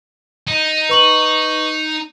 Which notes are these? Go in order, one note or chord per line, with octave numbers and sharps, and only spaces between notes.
D#4
B4 C#6 F#7